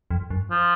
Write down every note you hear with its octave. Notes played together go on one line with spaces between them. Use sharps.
F2
F#2
F3